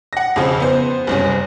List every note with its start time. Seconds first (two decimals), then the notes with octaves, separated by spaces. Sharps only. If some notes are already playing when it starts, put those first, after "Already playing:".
0.13 F#5 A#6
0.36 F2 C#3 C4
0.60 B3 C5
1.07 F#1 C2 C#4